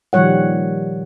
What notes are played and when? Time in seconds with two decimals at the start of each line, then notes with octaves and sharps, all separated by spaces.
0.13 A#2 D#3 F3 G3 C#5 F#5